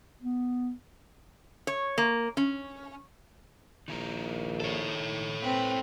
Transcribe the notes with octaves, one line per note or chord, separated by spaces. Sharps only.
B3
C#5
A#3
C#4
A#1 D#3 E4 A#4
A4 C#5
C4 B4